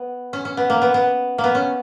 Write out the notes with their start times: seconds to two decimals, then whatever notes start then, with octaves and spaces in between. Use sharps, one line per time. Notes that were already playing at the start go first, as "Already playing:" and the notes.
Already playing: B3
0.33 C#4
0.45 C#4
0.57 B3
0.70 A#3
0.82 B3
0.94 B3
1.38 A#3
1.44 B3
1.55 C#4